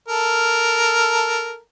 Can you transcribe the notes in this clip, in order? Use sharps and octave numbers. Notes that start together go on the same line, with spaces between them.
A4 A#4